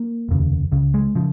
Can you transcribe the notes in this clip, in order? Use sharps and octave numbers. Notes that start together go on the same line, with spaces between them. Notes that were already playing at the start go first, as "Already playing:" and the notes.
Already playing: A#3
F1 D#2 C#3
C#2 C#3
G#3
C#3 F3